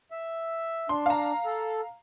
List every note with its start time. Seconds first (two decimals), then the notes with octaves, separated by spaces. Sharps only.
0.11 E5
0.89 D4 C6
1.06 F5 A#5
1.45 A4